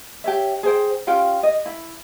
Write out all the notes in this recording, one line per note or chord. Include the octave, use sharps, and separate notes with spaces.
G4 C#5 E5
G#4 C5 G5
C#4 F4 G4 G5
D#5
E4